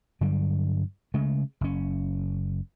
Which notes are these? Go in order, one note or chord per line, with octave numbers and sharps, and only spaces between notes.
G2 D3 F#3 G3
C#3 G#3 A3
F#1 C#4